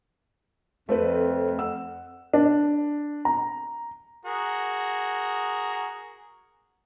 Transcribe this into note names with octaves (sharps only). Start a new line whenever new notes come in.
F2 A3 C4 B4
F#5 E6
D4
A#5
F#4 G#4 A#4